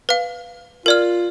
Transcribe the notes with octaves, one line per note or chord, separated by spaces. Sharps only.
B4 F5
F4 A#4 D5 F6